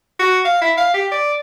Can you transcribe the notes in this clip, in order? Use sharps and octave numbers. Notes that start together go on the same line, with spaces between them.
F#4
F5
E4
F5
G4
D5